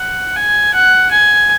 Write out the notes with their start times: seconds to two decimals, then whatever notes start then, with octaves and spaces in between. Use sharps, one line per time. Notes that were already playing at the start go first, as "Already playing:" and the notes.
Already playing: F#5
0.36 G#5
0.74 F#5
1.11 G#5